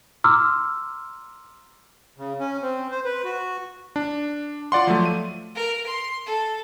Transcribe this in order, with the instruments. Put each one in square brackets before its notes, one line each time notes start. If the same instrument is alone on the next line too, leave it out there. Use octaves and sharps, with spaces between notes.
[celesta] A#5 C6 D6 E6 F6
[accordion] C#3
C#4
C4
C5
B4
F#4
[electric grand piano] D4
F4 D5 F#5 C6
F3 F#3 A3
D#7
[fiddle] A#4
C6
A4